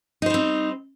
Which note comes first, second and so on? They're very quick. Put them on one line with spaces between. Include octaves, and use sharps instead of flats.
D#4 C5 G3 C4